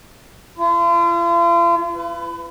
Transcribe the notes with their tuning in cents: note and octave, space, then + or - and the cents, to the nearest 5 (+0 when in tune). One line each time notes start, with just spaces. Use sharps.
F4 -40
B4 +30